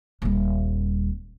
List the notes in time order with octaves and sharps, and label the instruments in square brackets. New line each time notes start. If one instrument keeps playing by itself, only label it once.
[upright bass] D#1 G3